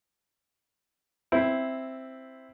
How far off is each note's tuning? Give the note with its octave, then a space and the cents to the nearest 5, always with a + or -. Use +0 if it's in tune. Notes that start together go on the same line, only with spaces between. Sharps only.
C4 +0 E4 +0